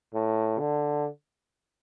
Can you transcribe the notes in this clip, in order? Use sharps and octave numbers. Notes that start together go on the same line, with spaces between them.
A2
D3